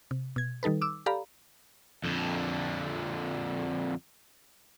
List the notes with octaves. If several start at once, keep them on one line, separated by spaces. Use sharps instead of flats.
C3
B2 G#6
D#3 G3 D#4 A4 B4
D6 E6
G4 A4 D5 F5 A#5 B5
F2 D3